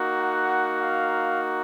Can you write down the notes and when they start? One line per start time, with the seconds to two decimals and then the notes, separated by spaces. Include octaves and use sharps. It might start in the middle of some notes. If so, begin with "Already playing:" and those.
Already playing: A#3 D#4 F#4
0.18 F#5
0.81 F5